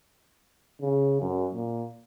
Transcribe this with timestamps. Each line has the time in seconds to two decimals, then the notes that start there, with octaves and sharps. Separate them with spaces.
0.81 C#3
1.21 F#2
1.54 A#2